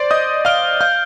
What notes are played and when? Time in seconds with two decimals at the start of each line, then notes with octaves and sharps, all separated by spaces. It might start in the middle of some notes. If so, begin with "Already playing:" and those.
Already playing: C5 D5 C6
0.11 D#5 D#6 G6
0.45 F5 F6 D7 G7
0.80 F5 F6 G6